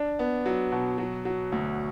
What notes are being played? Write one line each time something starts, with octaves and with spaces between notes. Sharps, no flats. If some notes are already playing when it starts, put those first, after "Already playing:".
Already playing: D4
B3
F#3
B2
F#3
F#3
D2